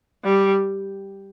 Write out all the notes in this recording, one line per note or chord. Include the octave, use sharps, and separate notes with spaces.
G3